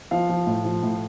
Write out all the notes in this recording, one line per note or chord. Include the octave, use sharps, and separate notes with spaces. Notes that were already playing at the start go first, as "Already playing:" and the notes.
F3 F5
F3
A2
F3
A2